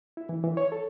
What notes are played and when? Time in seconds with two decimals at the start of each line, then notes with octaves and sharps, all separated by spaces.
0.17 E4
0.29 E3
0.44 E3
0.57 C#5
0.72 A4